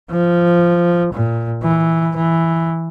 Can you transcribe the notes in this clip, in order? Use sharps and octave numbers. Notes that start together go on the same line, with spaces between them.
F3
A#2
E3
E3